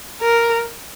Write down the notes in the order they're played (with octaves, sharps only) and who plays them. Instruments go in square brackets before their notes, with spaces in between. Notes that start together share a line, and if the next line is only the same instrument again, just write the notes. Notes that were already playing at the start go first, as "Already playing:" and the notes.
[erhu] A#4